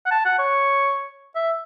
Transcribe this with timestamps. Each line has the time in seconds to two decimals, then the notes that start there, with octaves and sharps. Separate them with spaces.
0.06 F#5
0.11 A5
0.25 F#5
0.38 C#5
1.35 E5